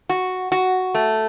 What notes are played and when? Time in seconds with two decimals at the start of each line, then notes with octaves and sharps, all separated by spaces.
0.09 F#4
0.52 F#4
0.94 A3